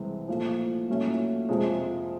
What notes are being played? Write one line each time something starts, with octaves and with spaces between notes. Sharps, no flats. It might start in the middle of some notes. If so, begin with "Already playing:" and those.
Already playing: C2 C3 E3 G#3
A#2 F3 A3
A#2 F#3 A3 C#4 E4
F2 C3 F3 G#3